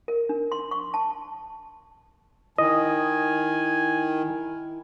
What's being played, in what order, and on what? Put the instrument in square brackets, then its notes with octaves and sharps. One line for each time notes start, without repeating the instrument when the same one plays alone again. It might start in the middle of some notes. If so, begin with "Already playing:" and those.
[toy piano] A#4
D4
C6
C#6
A5
[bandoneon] D#3 [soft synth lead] E4 [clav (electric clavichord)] D#5 [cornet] G#5